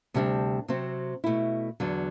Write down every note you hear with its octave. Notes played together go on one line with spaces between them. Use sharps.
D2 C3 G3 D4
C3 F#3 C4
B2 A3 E4
E2 D3 F#3